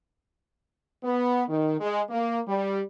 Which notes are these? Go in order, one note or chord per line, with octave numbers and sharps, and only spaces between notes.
B3
D#3
G#3
A#3
G3